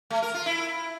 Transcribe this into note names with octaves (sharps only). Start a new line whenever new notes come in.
A3
A#4
F4
E4